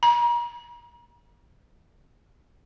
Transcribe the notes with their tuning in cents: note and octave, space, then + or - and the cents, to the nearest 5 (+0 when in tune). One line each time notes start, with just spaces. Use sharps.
A#5 +40